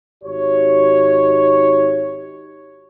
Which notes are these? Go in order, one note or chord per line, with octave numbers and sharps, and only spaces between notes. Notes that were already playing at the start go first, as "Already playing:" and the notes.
G#1 D#4 F#4 G4 C#5